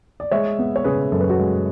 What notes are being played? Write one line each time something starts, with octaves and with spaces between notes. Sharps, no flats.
D5
G#3 C#5 E5
B3
C#5
C#3 G#4 B4
F#2 A4
B4
F#4 A4
G#3